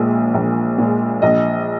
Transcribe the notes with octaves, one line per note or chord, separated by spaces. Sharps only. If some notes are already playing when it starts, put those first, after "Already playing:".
Already playing: A#1 A#2 G#3
A#1
A#2 G#3
A#1 D#5